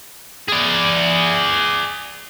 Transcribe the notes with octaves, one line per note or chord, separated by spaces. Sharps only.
G#4 D5